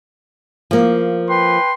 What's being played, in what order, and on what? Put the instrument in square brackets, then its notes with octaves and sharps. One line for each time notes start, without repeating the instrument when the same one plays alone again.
[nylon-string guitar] F3 A#3
[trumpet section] B4 G5 C6